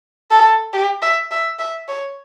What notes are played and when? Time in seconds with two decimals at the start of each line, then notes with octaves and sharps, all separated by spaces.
0.31 A4
0.74 G4
1.02 E5
1.31 E5
1.59 E5
1.88 C#5